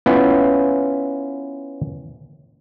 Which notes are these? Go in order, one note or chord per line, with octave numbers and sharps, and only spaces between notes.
B3 C#4 E4 F4 B4